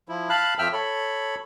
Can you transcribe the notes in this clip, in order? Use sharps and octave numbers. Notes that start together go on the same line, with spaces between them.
F3 E4
F5 A5 B5 F#6
F2 F3 E5 G5 E6 F6
A4 C#5 B5